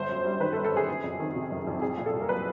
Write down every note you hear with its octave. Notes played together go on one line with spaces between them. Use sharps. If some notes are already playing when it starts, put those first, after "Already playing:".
Already playing: G1 D3 C5
F#2
G3
D#3 B4
A4
G1
A4
F#2 G#4
F#1
F2
D#3
C3
F#1
F2
C2 G#4
A#2
A4
C2
A#4
F#3 B4